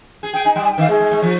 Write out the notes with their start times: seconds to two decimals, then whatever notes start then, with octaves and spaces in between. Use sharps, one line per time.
0.23 G#4
0.33 G#4 G5
0.45 D#4 G#5
0.56 G3 G5
0.64 G#5
0.72 G5
0.78 D#3 F5
0.89 G#3 G#4
1.00 G#3
1.12 G#3
1.22 F3